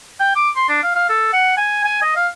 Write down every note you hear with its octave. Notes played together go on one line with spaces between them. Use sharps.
G5
D6
C6
D4
F5
F5
A4
F#5
G#5
G#5
D#5
F5